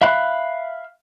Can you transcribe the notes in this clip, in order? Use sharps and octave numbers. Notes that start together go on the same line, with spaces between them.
E5 F5 B5 F#6